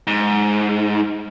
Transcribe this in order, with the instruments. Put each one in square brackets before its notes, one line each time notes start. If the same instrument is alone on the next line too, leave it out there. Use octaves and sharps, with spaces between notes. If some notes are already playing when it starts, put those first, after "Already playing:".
[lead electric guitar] G#2